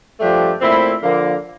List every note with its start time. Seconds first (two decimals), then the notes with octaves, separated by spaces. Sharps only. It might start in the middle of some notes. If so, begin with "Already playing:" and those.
0.20 G2 F3 A3 D4 G4
0.61 A#2 A3 C4 E4
1.02 D3 F3 A#3